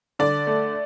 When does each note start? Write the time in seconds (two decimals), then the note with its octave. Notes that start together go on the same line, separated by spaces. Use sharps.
0.19 D3 D5
0.47 A3